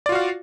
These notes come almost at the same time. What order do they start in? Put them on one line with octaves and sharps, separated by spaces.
D5 F4 F#4 F5